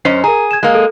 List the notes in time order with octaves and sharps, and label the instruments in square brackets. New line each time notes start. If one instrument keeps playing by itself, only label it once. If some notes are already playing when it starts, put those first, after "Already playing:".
[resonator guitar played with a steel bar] F#2 C#4 C5 [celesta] D#5 C7
[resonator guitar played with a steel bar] G#4 [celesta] A#4 A#5
[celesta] G#6 E7
[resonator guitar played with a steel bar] G#3 A#3
[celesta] A4